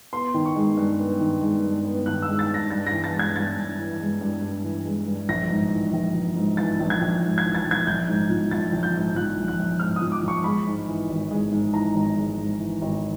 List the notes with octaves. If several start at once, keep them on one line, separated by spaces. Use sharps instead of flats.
B3 C6
D#3
C#6
G#3
G2
B3
D#3
G#3
G2
B3
D#3 F#6
E6
G#3
A6
G2
A#6
G2 A6
A#6
E3
A6
G#3
G#6
G2 A6
G2
E3
G#3
G2
G2
E3
G#3
G2
A#1 A#6
G#2
E3
A#1
A#1
G#2
E3 A6
A#1
G#6
A#1
G#2
G#6
E3
A6
A#1
G#6
A#1 G6
G#2
F3
A#1 A6
A#1
G6
G#2
F3 F#6
A#1
F#6
A#1
G#2 F6
D#6
F3
D6
A#1 C#6
G#3 B5
G#2
E3
G#1
G#3
G#2
E3 A#5
G#1
G#3
G#2
E3
G#1